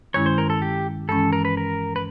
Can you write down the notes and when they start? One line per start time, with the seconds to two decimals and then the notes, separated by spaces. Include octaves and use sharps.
0.14 G2 D#3 G#3 C#4 E4 C#5
0.26 C5
0.38 A#4
0.50 A4
0.62 G4
1.09 G2 E3 G#3 C#4 A4
1.33 A#4
1.45 B4
1.57 A#4
1.96 B4